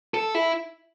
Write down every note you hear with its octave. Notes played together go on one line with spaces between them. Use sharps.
A4
E4